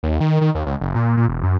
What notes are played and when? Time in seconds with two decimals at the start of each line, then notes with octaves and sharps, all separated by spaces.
0.03 D#2
0.20 D#3
0.41 D#3
0.55 D#2
0.66 C#2
0.81 F#1
0.96 A#2
1.17 A#2
1.29 E1
1.43 F#2